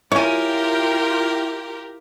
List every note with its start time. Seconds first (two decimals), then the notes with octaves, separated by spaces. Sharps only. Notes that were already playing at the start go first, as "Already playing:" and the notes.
0.12 E4 F4 G4 A#4 C#5 G5 G#5